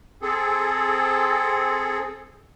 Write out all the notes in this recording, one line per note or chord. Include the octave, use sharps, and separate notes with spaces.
C4 G#4 A4